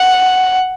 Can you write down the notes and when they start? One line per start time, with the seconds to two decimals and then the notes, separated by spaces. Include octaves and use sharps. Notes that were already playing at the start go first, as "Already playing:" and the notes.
Already playing: F#5